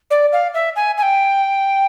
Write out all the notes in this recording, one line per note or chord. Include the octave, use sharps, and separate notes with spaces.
D5
F5
E5
G#5
G#5
G5